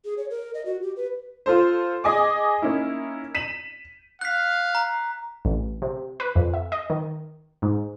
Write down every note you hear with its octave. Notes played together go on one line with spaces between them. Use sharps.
G#4
C#5
A#4
D#5
F#4
G4
B4
F4 A4 C5
G#4 D#5 G#5 D6
A#3 C#4 D#4 E4
B6 D#7 E7 F#7
F5 F#6 B6
A#5
A1
C3
B4
F2
E5
D#5
D#3
G#2